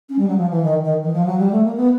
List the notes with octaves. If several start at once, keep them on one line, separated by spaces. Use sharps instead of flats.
C#4
G3
F#3
F3
E3
D#3
D#3
E3
F3
F#3
G3
A3
A#3
B3